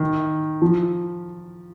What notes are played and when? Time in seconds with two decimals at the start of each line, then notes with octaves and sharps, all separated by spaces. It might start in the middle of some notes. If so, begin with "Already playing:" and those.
Already playing: D#3
0.62 F3